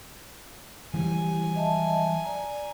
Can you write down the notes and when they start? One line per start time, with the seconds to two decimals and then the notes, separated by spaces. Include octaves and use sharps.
0.94 E3 F#3 G3 E4 G4 G#5
1.56 D#5 E5 A5
2.24 D5 A#5